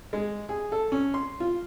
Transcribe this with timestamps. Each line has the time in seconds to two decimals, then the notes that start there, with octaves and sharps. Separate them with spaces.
0.13 G#3
0.49 G#4
0.72 A4
0.92 C#4
1.14 C6
1.40 F4